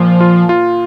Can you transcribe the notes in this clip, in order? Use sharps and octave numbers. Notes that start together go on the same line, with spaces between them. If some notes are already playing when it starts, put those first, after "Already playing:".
Already playing: A#2 F3 F4
F4
F4